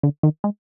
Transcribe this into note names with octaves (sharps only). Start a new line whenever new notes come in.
D3
D#3
G#3